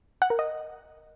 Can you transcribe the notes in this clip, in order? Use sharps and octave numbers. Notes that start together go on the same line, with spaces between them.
F#5
A#4
D#5